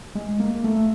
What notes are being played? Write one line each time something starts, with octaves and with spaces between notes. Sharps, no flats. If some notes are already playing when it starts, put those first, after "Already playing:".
G#3
A#3
A3